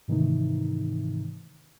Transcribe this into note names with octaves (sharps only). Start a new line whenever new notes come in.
G#2 C3 D#3 E3 A3 D#4